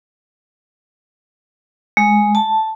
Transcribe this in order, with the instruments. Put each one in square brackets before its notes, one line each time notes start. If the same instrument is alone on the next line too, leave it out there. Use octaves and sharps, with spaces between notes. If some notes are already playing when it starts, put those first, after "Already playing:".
[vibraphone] G#3
A5